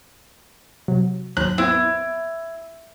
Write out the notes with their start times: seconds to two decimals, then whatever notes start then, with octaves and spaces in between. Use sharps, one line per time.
0.88 C3 F#3
1.37 D#2 G#2 F#3 F#6
1.58 B3 C4 E4 C5